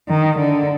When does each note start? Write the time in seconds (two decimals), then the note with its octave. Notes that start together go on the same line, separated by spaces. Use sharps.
0.09 D#3
0.39 D3